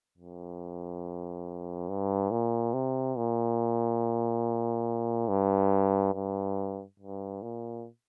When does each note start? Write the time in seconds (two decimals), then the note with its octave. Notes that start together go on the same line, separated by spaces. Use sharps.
0.18 F2
1.89 G2
2.31 A#2
2.74 C3
3.17 A#2
5.29 G2
6.14 G2
7.00 G2
7.42 A#2